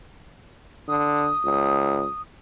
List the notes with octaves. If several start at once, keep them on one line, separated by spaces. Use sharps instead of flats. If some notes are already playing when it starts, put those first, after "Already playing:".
D3 D#6
C#2